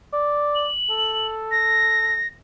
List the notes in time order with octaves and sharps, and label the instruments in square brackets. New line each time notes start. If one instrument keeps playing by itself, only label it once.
[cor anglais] D5
[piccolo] F#7
[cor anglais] A4
[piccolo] A#6